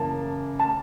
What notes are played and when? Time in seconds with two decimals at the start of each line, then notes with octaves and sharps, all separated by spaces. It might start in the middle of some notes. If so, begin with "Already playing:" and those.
Already playing: F#2 C#3 E3 A#3 A5
0.60 A5